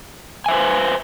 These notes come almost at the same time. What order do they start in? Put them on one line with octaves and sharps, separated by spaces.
G#5 E5 C5 B4